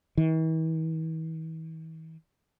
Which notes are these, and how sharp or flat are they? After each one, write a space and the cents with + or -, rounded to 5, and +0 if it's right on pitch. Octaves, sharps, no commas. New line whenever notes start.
E3 -45